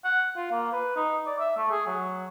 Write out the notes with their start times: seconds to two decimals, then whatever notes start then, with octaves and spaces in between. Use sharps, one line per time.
0.05 F#5
0.36 F4
0.51 A#3
0.72 B4
0.96 D#4
1.27 D5
1.39 E5
1.58 A3
1.71 G#4
1.87 F#3